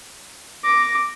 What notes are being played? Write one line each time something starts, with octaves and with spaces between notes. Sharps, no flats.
D6 A#6